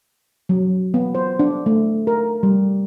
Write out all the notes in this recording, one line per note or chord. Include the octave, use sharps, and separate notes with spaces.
F#3
B3
C5
D4
A3
A#4
G3